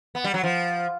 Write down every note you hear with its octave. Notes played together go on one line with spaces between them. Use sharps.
B3
G3
F#3
F3